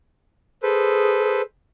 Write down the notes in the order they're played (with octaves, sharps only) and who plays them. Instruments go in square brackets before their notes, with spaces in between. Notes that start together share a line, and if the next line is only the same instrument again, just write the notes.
[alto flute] G#4 [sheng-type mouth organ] A4 B4 C5